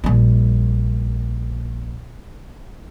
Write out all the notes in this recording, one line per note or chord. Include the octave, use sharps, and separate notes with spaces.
A#1 G3